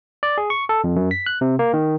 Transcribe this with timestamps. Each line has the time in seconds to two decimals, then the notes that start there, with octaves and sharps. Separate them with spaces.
0.23 D5
0.38 G#4
0.50 C#6
0.69 A4
0.84 F2
0.96 F#2
1.11 B6
1.26 F#6
1.41 C3
1.59 A#3
1.73 D#3